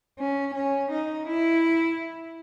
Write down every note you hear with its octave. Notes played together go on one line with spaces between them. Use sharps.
C#4
C#4
D#4
E4